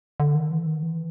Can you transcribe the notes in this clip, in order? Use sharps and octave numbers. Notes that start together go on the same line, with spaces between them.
D3
D#3
E3
D#3
E3